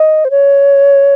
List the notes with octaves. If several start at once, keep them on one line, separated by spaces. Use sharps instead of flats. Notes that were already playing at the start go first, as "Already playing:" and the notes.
Already playing: D#5
C5
C#5